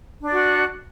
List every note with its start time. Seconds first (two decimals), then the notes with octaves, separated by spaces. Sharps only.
0.20 D4
0.25 D5
0.30 F#4